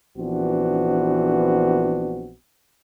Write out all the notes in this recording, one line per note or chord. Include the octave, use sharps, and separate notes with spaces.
A#1 E3 B3 C4 D4 F#4